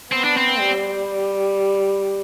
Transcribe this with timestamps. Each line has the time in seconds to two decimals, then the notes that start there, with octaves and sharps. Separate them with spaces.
0.12 B3 C4
0.24 D4
0.37 C4
0.58 G3